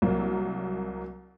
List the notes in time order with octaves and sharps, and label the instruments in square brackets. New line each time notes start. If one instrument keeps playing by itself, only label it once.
[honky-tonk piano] C2 F#3 A#3